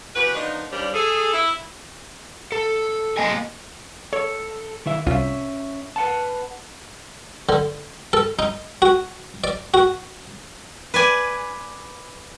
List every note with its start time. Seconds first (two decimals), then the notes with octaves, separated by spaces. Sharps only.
0.15 E3 F#4 G4 B4
0.35 F3 A#3 B3 D4 D#4
0.71 D#2 G3 A#3 C#4 D4 C5
0.94 G#4 A4
1.33 E4
2.52 A4
3.17 A#3 A#4 D#5 G5 G#5
4.13 A4 C#5
4.86 D#3 E4 E5
5.06 C2 C#4 F4 E5
5.96 B4 F#5 A5
7.49 D3
8.13 A4
8.39 D#4
8.82 F#4
9.44 D5
9.74 F#4
10.94 B4 D5 G#5